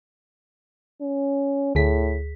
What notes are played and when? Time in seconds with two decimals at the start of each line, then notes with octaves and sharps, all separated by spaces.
1.01 C#4
1.75 D2 A2 G#4 B6